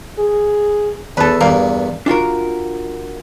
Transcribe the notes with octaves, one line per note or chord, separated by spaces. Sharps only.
G#4
E2 A4 B4
E2 G2 A#3
D4 F4 F#4 A#4